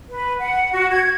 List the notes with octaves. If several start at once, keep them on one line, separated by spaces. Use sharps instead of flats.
B4
F#5
F#4
G#6